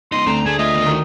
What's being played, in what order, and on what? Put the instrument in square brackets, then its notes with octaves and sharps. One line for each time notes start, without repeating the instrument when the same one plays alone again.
[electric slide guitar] G#3 B3 D#4 [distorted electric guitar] D#5 [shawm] C6
[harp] D2 [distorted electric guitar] C4 [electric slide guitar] A#5
[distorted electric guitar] A3 [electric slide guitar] G#4 [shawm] G#5
[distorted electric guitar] F4 [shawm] D#5 [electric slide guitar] E5
[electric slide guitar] D#3 B3 A#4
[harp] D#3 [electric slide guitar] A3 F#4